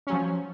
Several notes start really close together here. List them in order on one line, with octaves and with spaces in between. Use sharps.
C#4 F#3 F3